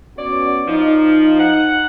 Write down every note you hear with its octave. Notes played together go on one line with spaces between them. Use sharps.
B3 C#4 F#4 C#5 D5
F3 D#4
F#5